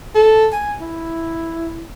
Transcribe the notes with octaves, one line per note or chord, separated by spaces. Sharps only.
A4
G#5
E4